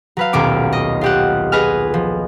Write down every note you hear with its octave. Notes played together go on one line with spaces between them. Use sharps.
F#3 B4 F5
D#1 B1 D6 G#6
D#5
F4 G4 F#5
G#4 B4 D#5 G#5 F6
F3